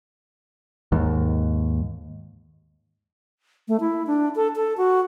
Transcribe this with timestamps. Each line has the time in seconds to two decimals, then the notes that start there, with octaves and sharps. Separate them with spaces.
0.92 D#2 G#2
3.68 A3
3.80 E4
4.07 D4
4.36 A4
4.56 A4
4.77 F#4